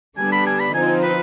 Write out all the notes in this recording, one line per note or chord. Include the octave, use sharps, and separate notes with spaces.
D3 G3 B3 D4 G#5
B5
G#5
B5
F3 C4 D#4 G#5
B4